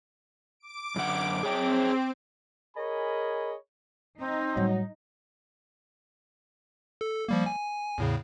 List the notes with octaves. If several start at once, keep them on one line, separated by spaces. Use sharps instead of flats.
D6 D7
F#2 D3 F#5
C4 G#4 C#5 G5
G#4 A#4 C#5 D#5 G#5 B5
C4 D#4
A2 F#3 G3
A4
F3 G3 A#3
G#5
E2 A2 C#3